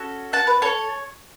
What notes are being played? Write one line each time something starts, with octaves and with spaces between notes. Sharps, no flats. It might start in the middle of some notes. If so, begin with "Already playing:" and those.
Already playing: C#4 F#4 A4
F#5 A5
B4
A4 C#5